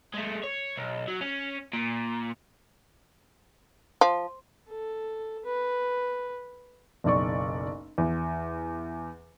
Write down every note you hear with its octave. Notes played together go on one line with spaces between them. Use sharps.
G#3 A3
C#5
B1
F#3
C#4
A#2
F3
A4
B4
F#1 B1 D5 C#6
E2